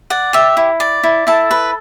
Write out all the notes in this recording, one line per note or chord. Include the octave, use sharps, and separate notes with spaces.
D5 F#5
G4 E5
E4
D5
E4
E4 A4 A5
B4